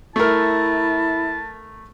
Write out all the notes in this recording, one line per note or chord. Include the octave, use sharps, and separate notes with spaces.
A3 E4 A#4 A5